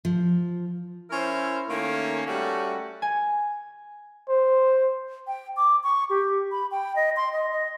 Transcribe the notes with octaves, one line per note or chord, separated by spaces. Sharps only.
F3
C#4 E4 A#4 C5
D#3 A3 A#3 C#4
G3 A3 C#4 F#4
G#5
C5
G5
D6
C#6
G4
B5
G5
D#5
C6
D#5
D#5